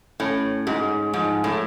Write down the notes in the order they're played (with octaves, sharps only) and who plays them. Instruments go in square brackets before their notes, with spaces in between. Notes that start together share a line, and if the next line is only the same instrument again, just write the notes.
[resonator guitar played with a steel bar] A2 [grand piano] C#4
[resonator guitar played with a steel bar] G#2 [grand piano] G#3
[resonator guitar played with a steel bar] G#2 [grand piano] F3
[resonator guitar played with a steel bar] A2